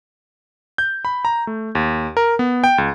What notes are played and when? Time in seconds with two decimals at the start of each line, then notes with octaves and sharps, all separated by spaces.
0.78 G6
1.05 B5
1.25 A#5
1.47 A3
1.75 D#2
2.17 A#4
2.39 B3
2.64 G5
2.78 C#2